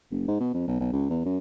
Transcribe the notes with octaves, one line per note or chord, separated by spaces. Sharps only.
F#1
G#2
B2
F2
B1
B1
C#2
E2
F#2